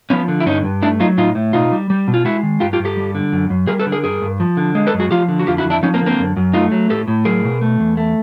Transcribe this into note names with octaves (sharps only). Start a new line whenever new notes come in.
F3 B3 C#4
D3
E4
G2 C#4 D#4
G2
A3 D4 E4
F#3 D#4 F4
A2 D#4 F4
A2
B2 D#4 F4
G3
G3
B2
F4
G#3 E4 F#4
D#3
G2 F4 G4
F4 G4
G2
G4 A4
G3
D3
F#2
F#2
G3 G#4 A#4
A4 B4
D3
G#4 A#4
G2 G#4 A#4
G2
F3
D3
G#3
A4 B4
F#2
F#4 G#4
F3 F4 G4
D3
F#4
F2 F4 G4
E4 F#4
F2
D4 E4
F3 C#4 D#4
A#3 C4
D3
A#3 C4
F#2
F#2
A3 D#4 F4
F#3
A2 G4 A4
A2
F#3 G#4 A#4
B2
A3
E2
A3